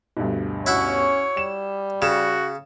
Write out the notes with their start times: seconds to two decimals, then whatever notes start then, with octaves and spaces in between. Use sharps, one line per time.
0.17 D2 G2 B2
0.66 C#4 E4 F#4 C#5 E5
1.37 G3 E7
2.02 C#3 F#4 E7